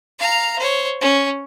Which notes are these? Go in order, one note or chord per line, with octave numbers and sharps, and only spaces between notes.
F5 A#5
C5 C#5
C#4